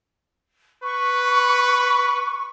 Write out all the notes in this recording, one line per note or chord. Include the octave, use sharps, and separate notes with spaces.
B4 C#6